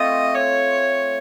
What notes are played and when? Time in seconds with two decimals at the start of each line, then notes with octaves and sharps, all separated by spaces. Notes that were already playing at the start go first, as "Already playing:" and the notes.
Already playing: A3 C4 F4 D#5
0.35 C#5